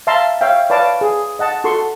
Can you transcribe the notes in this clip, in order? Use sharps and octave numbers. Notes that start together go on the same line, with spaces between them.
E5 F5 A5 A#5 C6
C#5 E5 F5 G5
B4 C#5 D5 F5 A5 D6
G#4
D#5 F#5 A5
F#4 A4 C6 C#6